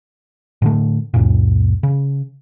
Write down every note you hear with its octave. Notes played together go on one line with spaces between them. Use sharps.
A2 D3 A3
C#2 F#2 A#2
C#3